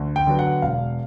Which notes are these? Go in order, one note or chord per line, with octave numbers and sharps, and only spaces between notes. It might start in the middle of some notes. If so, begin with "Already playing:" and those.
Already playing: D2
G5
D3 F#3 B3
F#5
E1 F5